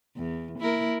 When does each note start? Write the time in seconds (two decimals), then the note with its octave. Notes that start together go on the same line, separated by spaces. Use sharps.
0.16 E2
0.59 A#3 E4 A#4